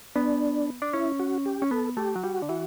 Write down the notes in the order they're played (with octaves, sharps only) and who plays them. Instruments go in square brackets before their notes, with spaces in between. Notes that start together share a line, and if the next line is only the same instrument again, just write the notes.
[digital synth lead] B3 [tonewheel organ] D4
[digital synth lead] D4
[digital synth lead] C#4 [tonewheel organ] E4
[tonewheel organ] F#4
G4
[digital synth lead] C#4
[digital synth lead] B3 [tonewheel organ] A4
[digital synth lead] A3 [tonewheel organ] G4
[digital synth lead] F#3
[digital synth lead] G3 [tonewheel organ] F#4
[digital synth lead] D3
[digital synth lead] E3 [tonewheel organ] F#4